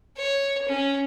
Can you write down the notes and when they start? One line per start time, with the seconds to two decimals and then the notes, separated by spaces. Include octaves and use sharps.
0.16 C#5
0.68 C#4